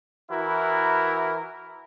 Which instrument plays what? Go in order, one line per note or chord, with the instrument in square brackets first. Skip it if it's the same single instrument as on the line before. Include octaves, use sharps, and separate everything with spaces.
[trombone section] E3 E4 F#4 A#4